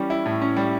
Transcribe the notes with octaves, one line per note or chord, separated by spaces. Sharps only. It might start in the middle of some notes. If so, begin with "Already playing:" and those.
Already playing: E3 G3 C#4
E4
A2
C#4
G3